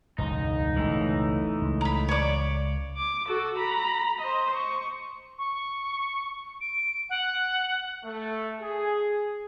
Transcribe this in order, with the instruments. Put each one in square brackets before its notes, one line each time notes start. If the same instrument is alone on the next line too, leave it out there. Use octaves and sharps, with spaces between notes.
[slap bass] E1 C#2 G2 [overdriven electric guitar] D#4
[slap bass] F#1 C#2 B2 [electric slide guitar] E3 A3
[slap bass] C#2
[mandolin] A#5 B5
C#5 D5
[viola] D6
F#4 A4
A#5 B5
C5 D#5
C#6
[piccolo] C#6
D7
F#5
[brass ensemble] A3
G#4